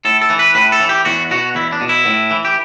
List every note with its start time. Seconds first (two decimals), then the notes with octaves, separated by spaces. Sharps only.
0.05 A2 A4
0.21 A4
0.30 E3
0.39 B4
0.55 A2 B4
0.72 A4
0.80 E3
0.89 G4
1.05 E2 F#4
1.31 B2 F#4
1.55 E2 E4
1.72 D4
1.81 B2
1.89 E4
2.06 A2
2.31 E3
2.45 G4